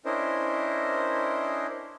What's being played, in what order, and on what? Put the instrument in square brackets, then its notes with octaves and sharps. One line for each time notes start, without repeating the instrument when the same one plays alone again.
[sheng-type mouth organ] C#4 D4 E4 A#4 C5 D#5